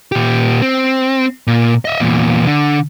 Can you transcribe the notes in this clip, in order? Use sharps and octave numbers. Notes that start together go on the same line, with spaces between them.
A#2 G4
C4
A#2
D#5 E5
E2 A#2
D3